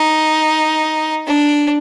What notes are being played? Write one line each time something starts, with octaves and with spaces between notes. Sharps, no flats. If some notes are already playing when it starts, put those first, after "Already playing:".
Already playing: D#4
D4